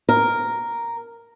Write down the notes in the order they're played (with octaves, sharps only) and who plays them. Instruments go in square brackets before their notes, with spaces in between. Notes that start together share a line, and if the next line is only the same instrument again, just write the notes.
[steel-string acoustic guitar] A#4